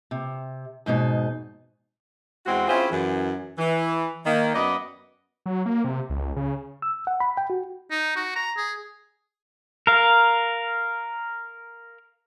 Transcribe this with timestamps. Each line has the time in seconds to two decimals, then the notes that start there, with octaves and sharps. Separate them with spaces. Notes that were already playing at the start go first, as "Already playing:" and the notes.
0.11 C3
0.86 E2 G#2 B2 D#4
2.46 E2 G#3 C4 F#4
2.68 C4 C#4 E4 F4 G#4 C5
2.91 F#2 E3
3.58 E3
4.26 D#3 A#3
4.54 F#2 B3 D5 D#5
5.46 F#3
5.66 A#3
5.84 C3
6.10 C#2
6.36 C#3
6.82 E6
7.07 F#5
7.20 B5
7.37 G5
7.50 F#4
7.91 D#4
8.16 F#4
8.35 A#5
8.57 G#4
9.87 A#4 F5